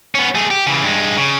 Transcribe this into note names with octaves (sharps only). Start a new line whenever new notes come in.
B3 C#4
A3 G#4
G4
C#3 E3
G2 G#3
C#3